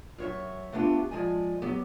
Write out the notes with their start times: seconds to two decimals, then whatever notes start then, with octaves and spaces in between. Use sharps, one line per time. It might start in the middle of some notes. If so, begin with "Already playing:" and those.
0.18 F#2 C#5 E5
0.72 A3 B3 D4 D#4 F4 G4
1.11 F3 G#3 D5 G#5
1.62 F#3 B3 G4